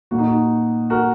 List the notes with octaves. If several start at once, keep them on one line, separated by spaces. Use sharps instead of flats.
A#2 A#3 F#4
D#4
F#4
F#4 A#4